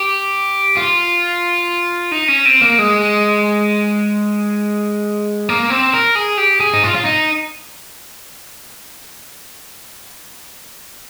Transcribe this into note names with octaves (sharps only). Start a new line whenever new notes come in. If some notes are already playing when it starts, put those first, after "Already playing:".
Already playing: G4
F4
D#4
C#4
C4
A#3
G#3
A#3
C4
A#4
G#4
G4
G#4
D#4
F4
F4
D#4